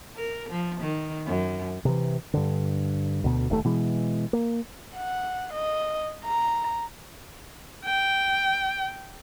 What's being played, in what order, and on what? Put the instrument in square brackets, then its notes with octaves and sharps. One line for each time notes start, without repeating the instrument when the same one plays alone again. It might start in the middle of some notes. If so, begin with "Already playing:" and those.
[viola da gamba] A#4
F3
D#3
F#2
[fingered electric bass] C3 E3
G2 D3
D2 B2
D1 D#2 F#3 A3
B2 E3 G#3
A#3
[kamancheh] F#5
D#5
A#5
[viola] G5